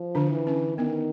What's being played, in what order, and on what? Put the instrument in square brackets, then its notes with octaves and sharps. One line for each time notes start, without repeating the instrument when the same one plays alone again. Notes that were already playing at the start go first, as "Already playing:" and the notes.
Already playing: [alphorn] F3
[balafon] D3 D4
[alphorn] E3
[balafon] C#4
[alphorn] D#3 [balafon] B3